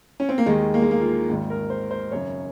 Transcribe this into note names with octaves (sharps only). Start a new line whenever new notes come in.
C#4
C4
A#3
D#2 D#3 G#3
A#3
G#3
A#3
F4
G#1 G#2 D#3
A#4
C5
C5
G#1 F#2 C#3 C#5